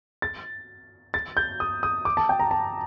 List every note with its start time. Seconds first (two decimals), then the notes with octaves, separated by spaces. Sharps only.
0.22 A6
1.14 A6
1.37 G6
1.60 D#6
1.83 D#6
2.05 D6
2.17 A5
2.29 G5
2.40 A#5
2.51 A5